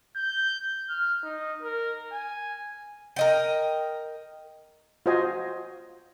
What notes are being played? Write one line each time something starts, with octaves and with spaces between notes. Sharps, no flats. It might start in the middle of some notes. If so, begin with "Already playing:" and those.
G6
F6
D#4
A#4
G#5
A#4 D#5 G5
F4 F#4 C5 D#5 F5 G#5